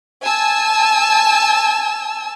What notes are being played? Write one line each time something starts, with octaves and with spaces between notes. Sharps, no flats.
G#5 A5 E6